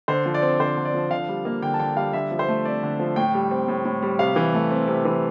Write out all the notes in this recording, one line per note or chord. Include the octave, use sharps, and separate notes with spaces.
D3 C5
F3
D5
C4
D3 C5
D3
D5
F3
D3 F5
G3
A#3
D3 G5
A5
D3 G5
G3 F5
D3 E5
F3
C5
A3
C4 D5
D3
F3
A2 G5
G3
C4
A2
A2
G3
C3 F5
E3
A3
C4
C3
E3